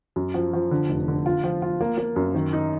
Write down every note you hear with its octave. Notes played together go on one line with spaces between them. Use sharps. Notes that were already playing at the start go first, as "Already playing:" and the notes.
F#2
F3
F3
D3
F1
D3
F4
F3
F4
A#3
A#3
F#2
D#3
D#4